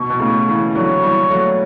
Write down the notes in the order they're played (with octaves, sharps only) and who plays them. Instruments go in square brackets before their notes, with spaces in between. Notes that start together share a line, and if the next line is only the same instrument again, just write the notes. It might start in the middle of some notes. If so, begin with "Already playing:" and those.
Already playing: [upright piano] B2 [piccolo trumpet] C#6
[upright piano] B2
A2 C#3
C#3 E3
E3
[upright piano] D3 F#3 [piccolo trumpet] C#6
[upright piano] E3 G3
F#3 A3